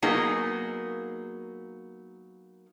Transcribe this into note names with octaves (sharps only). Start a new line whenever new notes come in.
F#3 A#3 B3 D#4 G#4